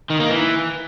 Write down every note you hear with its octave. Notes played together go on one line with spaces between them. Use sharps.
D#3
A#3
E3